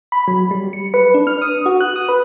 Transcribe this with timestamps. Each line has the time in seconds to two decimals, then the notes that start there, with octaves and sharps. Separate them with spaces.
0.12 B5
0.28 F#3
0.51 G3
0.73 C#7
0.94 B4
1.14 D4
1.27 F6
1.42 D#6
1.66 F#4
1.81 F#6
1.96 D#6
2.09 B4